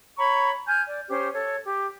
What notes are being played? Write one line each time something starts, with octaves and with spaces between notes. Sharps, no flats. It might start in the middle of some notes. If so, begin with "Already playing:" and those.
C#5 A#5 B5 C#6
G#5 F6 G6
D5
C#4 G4 C5
A4 C#5
G4